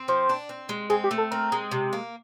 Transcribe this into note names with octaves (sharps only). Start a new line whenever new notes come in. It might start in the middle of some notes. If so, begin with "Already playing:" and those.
Already playing: C4
F3 C5
D4
C4
G#3
C4 G#4
G4
A3
A4
C4 A#4
G#3
C3
A#3